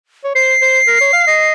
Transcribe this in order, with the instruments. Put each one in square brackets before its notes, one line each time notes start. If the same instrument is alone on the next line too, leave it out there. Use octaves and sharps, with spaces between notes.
[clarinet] C#5
[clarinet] C5 [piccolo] C7
[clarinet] C5
A#4
C#5
F5
D#5